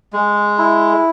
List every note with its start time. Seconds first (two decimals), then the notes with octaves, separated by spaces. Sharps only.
0.13 G#3
0.58 E4